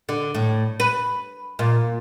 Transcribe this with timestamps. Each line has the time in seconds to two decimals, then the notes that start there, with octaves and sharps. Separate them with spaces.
0.09 D3
0.35 A2
0.80 B4
1.59 A#2